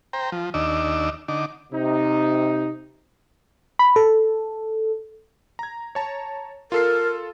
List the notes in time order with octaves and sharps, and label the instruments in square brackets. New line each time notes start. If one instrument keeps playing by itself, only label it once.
[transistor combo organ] C5 G5 A#5
F3
D#2 D4 D#4 D6 E6
D3 D#4 D6
[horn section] C3 D#4
[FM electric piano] B5
A4
[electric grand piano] A#5 G#6
C#5 A5 A#5
[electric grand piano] F4 A4 C7 [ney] A#4